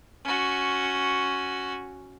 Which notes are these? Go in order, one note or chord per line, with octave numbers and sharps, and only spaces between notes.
C#4 F#4